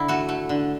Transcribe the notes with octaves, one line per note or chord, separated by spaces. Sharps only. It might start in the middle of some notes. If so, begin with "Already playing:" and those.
Already playing: D3 E4
A3 F#4
A3
D3